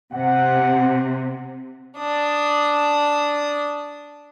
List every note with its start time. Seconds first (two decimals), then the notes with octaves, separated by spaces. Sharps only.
0.13 C3 F#5
1.99 D4 D#6